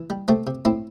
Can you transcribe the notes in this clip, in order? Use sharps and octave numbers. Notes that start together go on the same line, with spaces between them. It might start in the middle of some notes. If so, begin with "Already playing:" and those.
Already playing: E3
G3
C3 A3 C4
C3
A2 C4 E4